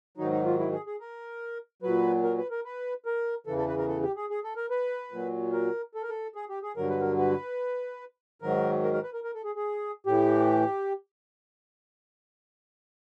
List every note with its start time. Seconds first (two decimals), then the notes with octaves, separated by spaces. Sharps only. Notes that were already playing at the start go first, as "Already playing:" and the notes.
0.17 G#2 D#3 F#3 D#4
0.32 D#4
0.45 F4
0.59 E4
0.72 G#4
0.86 G#4
1.00 A#4
1.82 A#2 F#3 B4
2.23 A#4
2.38 B4
2.51 A#4
2.65 B4
3.06 A#4
3.47 E2 C#3 E3 A4
3.58 A4
3.68 B4
3.78 A#4
3.88 A4
4.02 G4
4.16 G#4
4.30 G#4
4.44 A4
4.57 A#4
4.70 B4
5.12 A#2 F#3
5.53 A#4
5.95 A4
6.03 A#4
6.09 A4
6.35 G#4
6.49 G4
6.63 G#4
6.76 G2 D3 F#3 A#4
6.89 B4
7.01 A#4
7.18 B4
8.42 G#2 D#3 F#3 A#4
8.83 A#4
8.93 A#4
9.03 B4
9.13 A#4
9.24 A#4
9.35 A4
9.44 G#4
9.55 G#4
10.06 A2 E3 G4